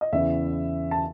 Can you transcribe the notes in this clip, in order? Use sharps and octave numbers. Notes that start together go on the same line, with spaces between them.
D#5
E2 C#3 E3 E5
A5